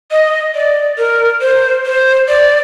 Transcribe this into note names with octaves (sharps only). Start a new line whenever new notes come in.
D#5
D5
A#4
C5
C5
D5